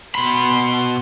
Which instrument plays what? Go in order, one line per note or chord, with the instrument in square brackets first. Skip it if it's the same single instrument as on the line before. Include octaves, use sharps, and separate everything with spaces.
[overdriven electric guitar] B2 B5 [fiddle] C6